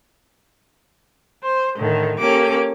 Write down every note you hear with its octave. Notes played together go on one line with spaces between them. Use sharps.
C5
A2 D3 D#3
A#3 C#4 G4 A4 D6